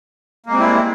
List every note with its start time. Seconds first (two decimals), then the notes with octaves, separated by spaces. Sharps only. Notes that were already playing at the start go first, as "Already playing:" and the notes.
0.46 A#3
0.49 G#3
0.53 C4
0.56 G3
0.59 E4